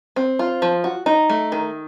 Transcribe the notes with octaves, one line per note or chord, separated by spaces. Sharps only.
C4
F4
F3
F#4
D#4
A3
D#3